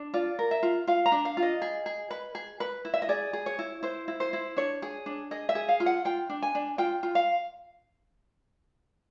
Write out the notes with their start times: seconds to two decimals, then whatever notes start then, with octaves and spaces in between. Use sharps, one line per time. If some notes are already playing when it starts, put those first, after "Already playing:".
Already playing: D4
0.14 F4 D5
0.39 A#4
0.51 E5
0.63 F4
0.87 F4 F5
1.06 A#5
1.12 D4
1.25 F5
1.37 F4
1.43 D#5
1.62 G#4
1.86 G#4
2.11 B4
2.35 G#4
2.60 B4
2.85 E4
2.94 E5
3.02 D#5
3.09 G#4 D5
3.33 G#4
3.46 C#5
3.59 E4
3.83 E4 C5
4.08 E4
4.20 C5
4.33 E4
4.57 D4 C#5
4.82 G#4
5.06 D4
5.31 G#4 D#5
5.49 E5
5.55 G#4
5.69 F5
5.80 F4
5.86 F#5
6.05 F4 G5
6.29 D4
6.42 G#5
6.55 D4
6.78 F4 G5
7.03 F4
7.15 F5